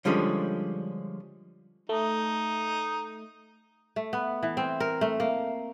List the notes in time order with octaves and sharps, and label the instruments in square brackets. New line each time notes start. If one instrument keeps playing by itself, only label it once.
[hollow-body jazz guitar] D3 F3 G3 G#3 C#4
[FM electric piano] A3 [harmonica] D#4
[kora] A3
B3
E3
C4
A#4
A3
A#3